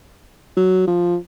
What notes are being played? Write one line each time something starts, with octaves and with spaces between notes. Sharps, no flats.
F#3
F3